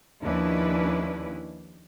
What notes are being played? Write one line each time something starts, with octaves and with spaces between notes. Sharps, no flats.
D#2 F3 C#4 D4 E4 B4